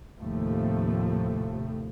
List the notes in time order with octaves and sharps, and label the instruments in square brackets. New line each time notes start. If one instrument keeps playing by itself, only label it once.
[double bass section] D#2 A2 C3 F3 A3